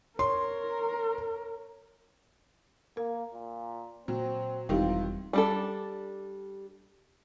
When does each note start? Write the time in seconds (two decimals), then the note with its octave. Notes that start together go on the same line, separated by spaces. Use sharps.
0.19 A#4 C#5 C6
2.97 A#3 A#4
3.33 A#2
4.08 A#2 F#3 C4
4.69 E1 D#3 E3 G3 C4 D#4 F4 G4
5.33 G3 D4 A4